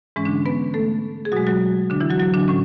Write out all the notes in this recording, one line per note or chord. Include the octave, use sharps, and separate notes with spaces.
G#2 E3 G#3 C#4
D3 D4
B3 B4
A3 A4
G#4
B2 F#3 G#3 F#4
F#3 F#4
D3 D4
E3 E4
F#3 F#4
F#3 F#4
D3 D4
A2 C#4